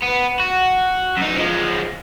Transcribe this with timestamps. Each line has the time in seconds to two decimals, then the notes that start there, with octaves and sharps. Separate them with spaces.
0.02 B3
0.40 F#4
1.17 F#2 D#4
1.36 F3 G#3